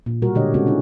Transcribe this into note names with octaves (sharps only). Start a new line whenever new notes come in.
A#2
B2 G3 F#4 A#4
A#2 D3 G#3 G4 C#5 D#5
C#3 G#3 C4 C#4 F#4 A4
C#4 D4 E4 F4